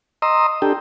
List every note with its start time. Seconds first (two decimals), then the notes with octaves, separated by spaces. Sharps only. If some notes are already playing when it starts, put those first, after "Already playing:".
0.22 D#5 A#5 C6 D#6 E6
0.62 D4 G4 A4 G5